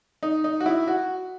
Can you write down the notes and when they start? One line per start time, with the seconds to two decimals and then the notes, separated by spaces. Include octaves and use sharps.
0.23 D#4
0.44 D#4
0.61 F#4
0.66 E4
0.87 F#4